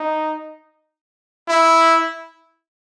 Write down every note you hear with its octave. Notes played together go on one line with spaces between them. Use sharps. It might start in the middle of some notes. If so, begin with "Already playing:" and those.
Already playing: D#4
E4